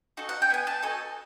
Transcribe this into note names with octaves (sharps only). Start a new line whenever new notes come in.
D#4 F#4 A4
F#5
G5
B3 G#5
A5
D#4 F#4 A4 G#5